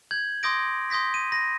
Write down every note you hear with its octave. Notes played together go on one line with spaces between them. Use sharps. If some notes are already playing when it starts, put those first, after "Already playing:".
G6 G#6 F#7
C6 D6 D#6 G6 A#6 D7
C6 D#6 G6 A#6 B6
D#7
B5 A#6